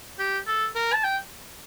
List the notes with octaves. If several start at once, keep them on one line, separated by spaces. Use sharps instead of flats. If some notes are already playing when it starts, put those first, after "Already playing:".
G4
A4
A#4
A5
G5